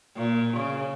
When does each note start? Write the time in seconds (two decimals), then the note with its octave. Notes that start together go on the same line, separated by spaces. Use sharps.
0.16 A#2
0.57 C#3